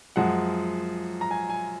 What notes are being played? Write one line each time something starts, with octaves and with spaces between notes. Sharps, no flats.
F#2 F3 G#3 F#5
A#5
G#5
G#5